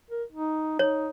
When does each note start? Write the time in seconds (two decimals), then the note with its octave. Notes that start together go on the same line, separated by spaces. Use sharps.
0.11 A#4
0.32 D#4
0.79 D#4 C#5